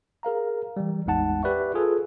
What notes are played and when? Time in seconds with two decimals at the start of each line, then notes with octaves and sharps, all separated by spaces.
0.23 G#4 A#4 F5 A#5
0.77 E3 G3
1.06 A1 E2 G#3 D#4 F#5 A5
1.43 G4 B4 D5 E5 C#6
1.74 F4 G#4 A4 B4